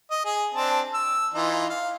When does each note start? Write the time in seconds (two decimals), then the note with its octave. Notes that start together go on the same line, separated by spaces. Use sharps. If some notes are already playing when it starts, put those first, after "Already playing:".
0.11 D#5
0.25 G#4 D#6
0.54 C4 D4 A5
0.94 E6
1.34 E3 D#4 F4
1.70 F5